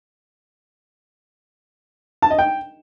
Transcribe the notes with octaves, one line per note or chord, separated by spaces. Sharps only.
A5
D#5
G5